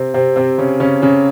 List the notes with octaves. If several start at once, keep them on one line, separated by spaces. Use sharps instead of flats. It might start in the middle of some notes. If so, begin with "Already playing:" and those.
Already playing: C3 C4
C3 C4
C3 C4
C#3 C#4
C#3 C#4
C#3 C#4